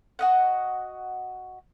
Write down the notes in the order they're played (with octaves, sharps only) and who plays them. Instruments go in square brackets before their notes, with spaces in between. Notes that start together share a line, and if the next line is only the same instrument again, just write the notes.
[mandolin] F#4 D#5 F#5